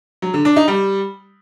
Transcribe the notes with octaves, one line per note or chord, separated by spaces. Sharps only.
F#3
D3
D4
D#4
G3